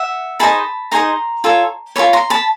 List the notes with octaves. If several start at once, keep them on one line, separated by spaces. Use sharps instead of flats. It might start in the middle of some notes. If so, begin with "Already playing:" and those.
Already playing: E5 F#5
D#4 G#4 C5 D#5 A5 B5
D#4 G#4 C5 D#5 A#5 C6
F4 A4 C#5
F4 A4 C#5 B5 C#6
A#5 C6
A5 B5